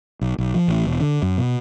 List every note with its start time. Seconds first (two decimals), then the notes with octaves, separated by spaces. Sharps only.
0.21 B1
0.38 B1
0.54 F3
0.68 A1
0.86 E1
1.01 D3
1.22 F#2
1.38 B2